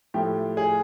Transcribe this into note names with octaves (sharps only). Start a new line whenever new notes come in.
A2 F3 A3 G4
G#4